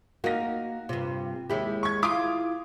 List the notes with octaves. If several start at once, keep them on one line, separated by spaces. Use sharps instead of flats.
A#3 D#4 F#4 A#6
G2 C3 F4
D#2 G#3 E4 G4 E5
C#6 G#6
E4 F4 F5 D6 D#6